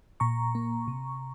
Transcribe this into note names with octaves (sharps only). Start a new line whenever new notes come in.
A#2 A#5 C#6
A#3
C3